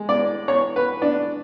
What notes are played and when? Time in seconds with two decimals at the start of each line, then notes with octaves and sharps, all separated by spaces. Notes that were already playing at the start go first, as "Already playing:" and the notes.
Already playing: G#3
0.09 D5
0.48 C#5
0.76 B4
1.02 D4